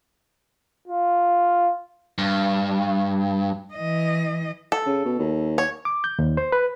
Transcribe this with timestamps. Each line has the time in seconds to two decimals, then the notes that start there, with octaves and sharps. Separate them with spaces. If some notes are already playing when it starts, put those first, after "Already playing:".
0.88 F4
2.18 G2
3.73 E3 D#5
4.72 A4
4.86 C#3
5.05 B2
5.19 D#2
5.58 C#5
5.85 D6
6.04 G6
6.19 D#2
6.37 C5
6.52 B4